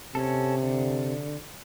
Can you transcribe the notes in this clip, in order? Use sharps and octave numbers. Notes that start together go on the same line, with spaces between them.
C3 C#4 A4
D3